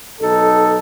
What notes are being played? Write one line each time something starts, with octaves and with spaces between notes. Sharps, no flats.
B1 D#4 A4